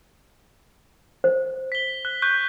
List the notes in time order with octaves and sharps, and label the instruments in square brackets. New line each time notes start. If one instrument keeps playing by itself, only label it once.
[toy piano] C5
[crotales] B6 G7
F#6
C#6 F#6 G6